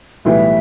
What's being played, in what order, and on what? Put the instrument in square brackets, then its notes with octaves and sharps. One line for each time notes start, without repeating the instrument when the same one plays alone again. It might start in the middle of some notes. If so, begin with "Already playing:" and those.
[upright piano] B1 A2 E3 G3 B3 [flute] E5